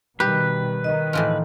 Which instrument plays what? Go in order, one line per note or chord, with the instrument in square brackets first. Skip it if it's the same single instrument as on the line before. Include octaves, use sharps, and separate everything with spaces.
[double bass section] B2 D#3 G3 [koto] G4 [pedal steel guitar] B4
[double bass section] D#3 [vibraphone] D#5
[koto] A2 E3 F3